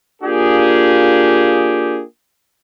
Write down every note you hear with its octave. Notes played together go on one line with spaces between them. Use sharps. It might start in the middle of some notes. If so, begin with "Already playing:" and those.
A#3 D4 F4 G4 G#4